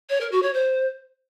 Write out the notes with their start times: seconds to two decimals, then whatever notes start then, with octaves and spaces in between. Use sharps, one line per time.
0.09 C#5
0.20 A#4
0.31 F#4
0.42 C#5
0.53 C5